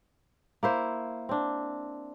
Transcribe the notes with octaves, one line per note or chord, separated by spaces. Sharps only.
A#3 E4 C5
C4 D4